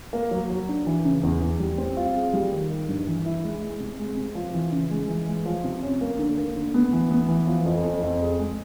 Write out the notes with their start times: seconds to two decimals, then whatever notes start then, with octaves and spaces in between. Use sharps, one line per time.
0.13 A#3
0.31 F#3
0.50 F#3
0.69 D4
0.87 E3
1.05 C#3
1.23 E2
1.42 E2
1.60 G3
1.78 C4
1.97 F4
2.15 G#4
2.33 G3
2.52 D#3
2.70 D#3
2.89 G2
3.07 E3
3.26 E4
3.43 G#3
3.62 G#3
3.80 C3
3.99 G#3
4.17 C3
4.35 F3
4.54 E3
4.72 C#3
4.90 G#3
5.08 E3
5.28 G#3
5.46 F3
5.64 C3
5.82 C#4
6.01 A#3
6.19 D3
6.37 A#3
6.56 D3
6.74 B3
6.93 E3
7.11 B3
7.28 E3
7.47 F3
7.65 F2
7.84 F2
8.03 F2
8.21 G#4
8.39 G#3